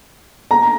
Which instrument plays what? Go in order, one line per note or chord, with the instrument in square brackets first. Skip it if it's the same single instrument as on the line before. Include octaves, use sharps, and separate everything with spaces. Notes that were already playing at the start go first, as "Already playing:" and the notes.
[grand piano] A#5